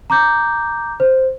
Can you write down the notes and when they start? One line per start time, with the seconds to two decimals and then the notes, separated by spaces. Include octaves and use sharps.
0.10 A#5 D6 G6
1.00 C5